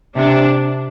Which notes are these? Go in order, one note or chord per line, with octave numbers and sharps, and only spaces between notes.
C3 D4